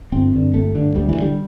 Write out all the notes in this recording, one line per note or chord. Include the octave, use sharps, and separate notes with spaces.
G1 C4
G2 D3
G1 A3
G2 D3
D2 G3
E3
D3
G3